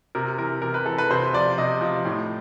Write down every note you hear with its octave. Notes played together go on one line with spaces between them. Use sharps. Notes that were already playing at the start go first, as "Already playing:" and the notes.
C3 A#4
E3 A#4
C3 A#4
B4
E3 A4
B4
C3 C5
F3 D5
C3 D#5
F3
A2